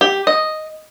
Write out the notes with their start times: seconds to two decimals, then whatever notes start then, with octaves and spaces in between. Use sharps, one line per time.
0.01 G4
0.27 D#5